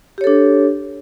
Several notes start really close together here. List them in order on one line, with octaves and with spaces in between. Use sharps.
G4 C#5 A4 D4